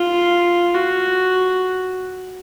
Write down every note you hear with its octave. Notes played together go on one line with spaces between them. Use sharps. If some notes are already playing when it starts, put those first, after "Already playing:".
Already playing: F4
F#4